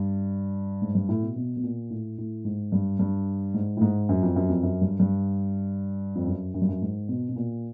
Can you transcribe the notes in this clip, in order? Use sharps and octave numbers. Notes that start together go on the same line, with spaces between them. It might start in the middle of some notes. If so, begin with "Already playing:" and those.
Already playing: G2
G#2
G2
A2
B2
B2
B2
A#2
A2
A2
G#2
G2
G2
G#2
A2
G#2
F#2
F2
F#2
F2
F#2
G2
G2
F2
F#2
F#2
G2
F#2
G#2
B2
B2
A#2